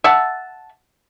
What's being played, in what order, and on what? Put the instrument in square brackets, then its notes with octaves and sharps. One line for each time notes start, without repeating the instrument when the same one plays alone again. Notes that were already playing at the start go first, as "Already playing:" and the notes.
[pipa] E5 F#5 A5